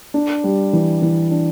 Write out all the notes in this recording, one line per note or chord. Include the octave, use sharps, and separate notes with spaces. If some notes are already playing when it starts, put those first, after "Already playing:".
D4
G3
E3
E3
D4